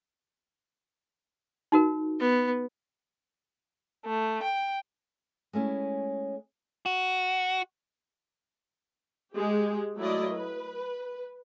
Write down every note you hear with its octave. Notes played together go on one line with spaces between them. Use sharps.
D#4 F#4 A#4
B3
A3
G5
G#3 A3 C#4 E4
F#4
G#3 G4
F#3 A3 E4 F#4 D5 D#5
B4